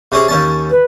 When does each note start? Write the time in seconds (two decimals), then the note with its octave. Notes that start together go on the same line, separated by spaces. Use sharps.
0.12 C3 C#4 G#4
0.28 D#2 C#4 A5
0.71 B4